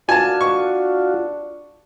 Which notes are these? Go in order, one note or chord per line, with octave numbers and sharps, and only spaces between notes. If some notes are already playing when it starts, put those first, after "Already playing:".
D4 F4 F#4 G#5 A5
C#6